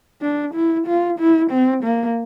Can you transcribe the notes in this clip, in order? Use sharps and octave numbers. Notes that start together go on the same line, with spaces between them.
D4
E4
F4
E4
C4
A#3